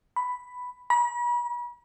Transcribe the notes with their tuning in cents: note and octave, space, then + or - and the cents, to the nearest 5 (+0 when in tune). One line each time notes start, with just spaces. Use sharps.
B5 +5
B5 -40